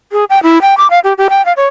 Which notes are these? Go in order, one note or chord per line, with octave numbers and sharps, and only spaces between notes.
G#4
G5
E4
G5
D6
F5
G4
G4
G5
F5
C#5